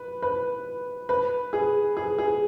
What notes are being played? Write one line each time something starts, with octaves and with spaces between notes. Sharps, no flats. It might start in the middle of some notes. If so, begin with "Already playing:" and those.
Already playing: B4
B4
B4
G#4
G#4
G#4